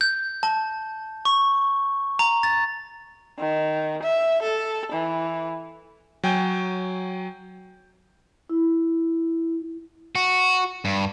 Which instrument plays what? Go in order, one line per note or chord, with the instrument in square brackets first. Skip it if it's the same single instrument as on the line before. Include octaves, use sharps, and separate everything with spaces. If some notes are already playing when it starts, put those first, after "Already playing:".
[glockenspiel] G6
A5
C#6
A#5
A6
[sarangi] D#3
E5
A4
E3
[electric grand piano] F#3 G5 G#5 G6
[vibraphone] E4
[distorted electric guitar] F#4
G2